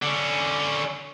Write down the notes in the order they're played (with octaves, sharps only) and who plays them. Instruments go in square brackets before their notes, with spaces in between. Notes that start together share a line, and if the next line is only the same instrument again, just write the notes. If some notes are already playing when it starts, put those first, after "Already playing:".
[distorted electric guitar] D3 C#4